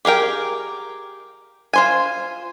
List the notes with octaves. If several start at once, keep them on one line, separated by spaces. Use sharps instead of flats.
G4 G#4 A#4 G5
F4 C5 G#5